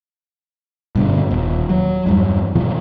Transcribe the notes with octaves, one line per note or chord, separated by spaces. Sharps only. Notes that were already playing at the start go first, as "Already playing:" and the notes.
G2 B2 D3
D#1
F#3
E2 G2
B2 E3 F3